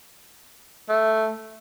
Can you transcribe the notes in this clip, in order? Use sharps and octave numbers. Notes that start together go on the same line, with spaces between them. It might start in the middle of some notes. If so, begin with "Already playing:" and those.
A3